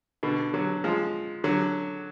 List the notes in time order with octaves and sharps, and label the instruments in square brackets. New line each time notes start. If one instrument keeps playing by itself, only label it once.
[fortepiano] B2 D3
D3 F#3
F3 G#3
D3 F#3